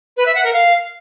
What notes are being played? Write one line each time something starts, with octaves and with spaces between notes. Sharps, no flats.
B4
E5
F#5
A#4
F5